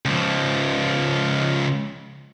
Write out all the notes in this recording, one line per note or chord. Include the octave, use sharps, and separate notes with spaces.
C#2 F3